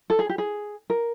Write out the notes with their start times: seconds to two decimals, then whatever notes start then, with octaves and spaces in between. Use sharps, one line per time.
0.10 A4
0.19 G#4
0.29 G4
0.38 G#4
0.90 A#4